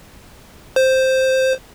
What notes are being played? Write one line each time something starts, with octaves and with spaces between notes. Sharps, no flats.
C5